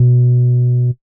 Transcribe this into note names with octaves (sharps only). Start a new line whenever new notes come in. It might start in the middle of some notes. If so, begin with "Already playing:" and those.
Already playing: B2